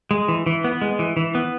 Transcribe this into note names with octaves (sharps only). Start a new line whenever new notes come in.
G#3
E3
E3
B3
G#3
E3
E3
B3